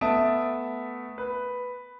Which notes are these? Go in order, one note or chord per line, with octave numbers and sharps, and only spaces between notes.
A3 B3 E5 A5 D#6 D7
B4